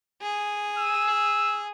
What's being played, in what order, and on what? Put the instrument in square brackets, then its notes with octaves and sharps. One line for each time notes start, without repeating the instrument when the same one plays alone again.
[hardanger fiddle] G#4
[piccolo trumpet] E6